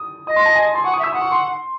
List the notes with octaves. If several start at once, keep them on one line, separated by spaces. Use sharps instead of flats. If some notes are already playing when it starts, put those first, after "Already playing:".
Already playing: D#6
D#5 D#6
C6
A5
G#5
C6
F#5 C#6
D#6
E5 E6
F#5 D#6
C#6
C6